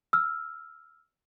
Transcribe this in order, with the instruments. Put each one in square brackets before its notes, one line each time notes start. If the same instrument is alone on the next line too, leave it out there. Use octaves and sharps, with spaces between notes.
[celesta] E6 F6